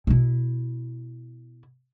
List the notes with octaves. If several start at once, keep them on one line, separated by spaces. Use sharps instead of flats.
B2 E4